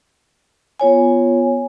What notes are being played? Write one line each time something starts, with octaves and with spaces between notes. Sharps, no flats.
B3 F4 C#5 G#5